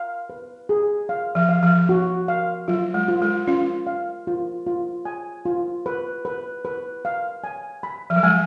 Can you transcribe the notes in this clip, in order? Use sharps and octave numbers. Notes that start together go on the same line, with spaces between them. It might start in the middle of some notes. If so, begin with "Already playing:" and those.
Already playing: F5
B4
G#4
F5
F3
F5
F3
F#4
F5
F#3 F4
G#3
F4
G#3
C#4 F4
F5
F4
F4
G#5
F4
B4
B4
B4
F5
G#5
B5
F3
F#3
G#3 G#5